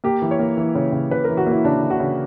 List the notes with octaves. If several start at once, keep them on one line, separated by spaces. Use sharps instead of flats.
A#3 G4
E3
C#5
A#3
E3
C#3
C#3
C#3 B4
A#4
E3
F#4
A#3 E4
C#3 D4
C#3
F#4
C#3